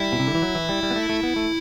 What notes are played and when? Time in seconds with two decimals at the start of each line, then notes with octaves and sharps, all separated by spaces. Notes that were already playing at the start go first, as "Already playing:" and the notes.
Already playing: G3 E4
0.12 B2
0.19 C3
0.27 D3
0.35 E3
0.42 F#3
0.55 E3
0.69 G3
0.83 G3
0.91 B3
0.96 A3
1.09 A3
1.23 B3
1.36 A3